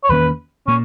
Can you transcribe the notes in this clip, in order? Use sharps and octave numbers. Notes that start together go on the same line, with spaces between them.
C#5
E2 D#3 A#3 C#4 B4
A#2 A#3 C#4